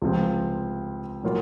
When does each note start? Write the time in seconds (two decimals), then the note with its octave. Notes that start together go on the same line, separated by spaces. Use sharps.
0.02 C#2 C3 F3 C4
1.23 A#2 F#3 A#3 F4